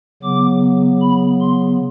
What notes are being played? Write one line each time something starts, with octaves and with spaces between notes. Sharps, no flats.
C#3 F#3 B3 D6
B5
C6